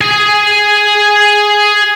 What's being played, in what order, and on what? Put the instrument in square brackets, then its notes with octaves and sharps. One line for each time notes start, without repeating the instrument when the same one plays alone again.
[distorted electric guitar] G#4 G#5